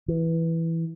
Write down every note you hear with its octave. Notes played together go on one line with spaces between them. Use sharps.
E3